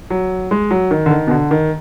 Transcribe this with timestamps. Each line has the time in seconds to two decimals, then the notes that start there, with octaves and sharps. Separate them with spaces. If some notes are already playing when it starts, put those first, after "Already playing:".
0.10 F#3
0.51 G#3
0.71 F#3
0.91 D#3
1.06 D3
1.11 D#3
1.27 B2
1.31 D3
1.51 D#3